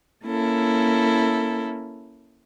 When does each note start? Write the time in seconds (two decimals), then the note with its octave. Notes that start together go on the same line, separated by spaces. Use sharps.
0.25 A#3 C#4 E4 A4